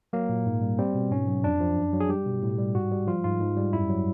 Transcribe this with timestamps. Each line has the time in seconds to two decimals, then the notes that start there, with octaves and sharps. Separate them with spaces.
0.13 F#3 A#3
0.29 A#2
0.46 G#2
0.62 G3
0.78 G3 C4
0.95 B2
1.11 G#2 C#4
1.28 F#3
1.44 F2 D4
1.60 F3
1.77 F#2
1.93 F#3
2.00 G#4
2.09 G3 G4
2.26 B2
2.42 A2
2.58 G3
2.75 G#2 F#4
2.92 G3
3.07 F3 F4
3.24 G#2 F4
3.40 G#2
3.57 G3
3.73 F#2 E4
3.89 F#3